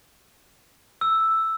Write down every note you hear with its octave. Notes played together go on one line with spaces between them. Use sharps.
E6